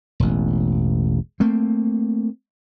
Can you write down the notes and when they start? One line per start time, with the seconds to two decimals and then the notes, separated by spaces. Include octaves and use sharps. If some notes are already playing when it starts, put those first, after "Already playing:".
0.20 E1 A1
1.40 A3 A#3 C4